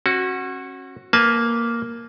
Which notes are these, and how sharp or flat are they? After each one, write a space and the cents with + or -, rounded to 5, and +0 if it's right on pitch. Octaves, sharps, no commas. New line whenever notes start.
C#4 -35 F#4 +0
A#3 +0 B4 +0 A5 -35